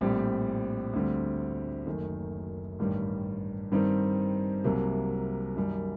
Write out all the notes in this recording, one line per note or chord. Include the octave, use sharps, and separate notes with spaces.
A#1 A2 G3 C4 G4
D2 D3 G3 C4
F#1 F#2 D#3 A3
A1 G2 D#3 G3
G2 D#3 G3 C4 D#4
C2 C3 F#3 A#3
F#2 D#3 G3 A#3